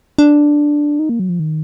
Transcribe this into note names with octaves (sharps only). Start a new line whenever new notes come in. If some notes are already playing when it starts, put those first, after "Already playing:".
D4
D#4
A#3
F#3
F3
D#3